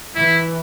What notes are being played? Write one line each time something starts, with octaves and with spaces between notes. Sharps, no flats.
E3 E4